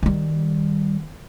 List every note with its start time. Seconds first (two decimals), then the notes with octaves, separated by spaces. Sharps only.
0.03 D#3 G3